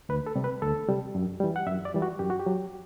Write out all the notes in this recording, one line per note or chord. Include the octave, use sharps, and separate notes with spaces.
D2 B4
A4
C3 G3
B4
D2 A4
C3 G3
F#2
E3 G3
F#5
F#2 E5
D5
E3 G3
F#4
F#2 G4
F#4
G4
F#3